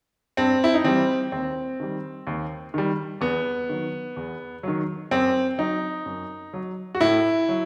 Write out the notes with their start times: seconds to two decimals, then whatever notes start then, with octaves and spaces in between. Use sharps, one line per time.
0.37 G2 C4
0.64 E4
0.74 D#4
0.84 E3 G3 C4
1.32 D#2 C4
1.80 D#3 G3
2.27 D#2
2.74 D#3 G3
3.21 E2 B3
3.69 D#3 F#3
4.16 E2
4.63 D#3 F#3
5.11 F#2 C4
5.58 F#3 D#4
6.06 F#2
6.54 F#3
6.95 F#4
7.01 A2 E4
7.49 F#3